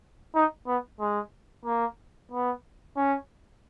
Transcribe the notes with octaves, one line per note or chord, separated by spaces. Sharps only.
D#4
B3
G#3
A#3
B3
C#4